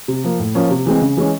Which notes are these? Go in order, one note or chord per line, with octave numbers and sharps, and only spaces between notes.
C3
F3 A#3
A2
F3 A#3 C#4
C3
E3 G#3 C4
C#3
E3 G#3 C#4